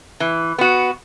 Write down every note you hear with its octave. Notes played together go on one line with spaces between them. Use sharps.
E3
B3 F#4